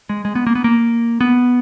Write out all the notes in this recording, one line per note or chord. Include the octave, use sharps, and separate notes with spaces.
G#3
G#3
B3
A#3
B3
A#3
B3